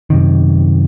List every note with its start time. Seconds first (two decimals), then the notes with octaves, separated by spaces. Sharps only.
0.10 F#2 C3 D#3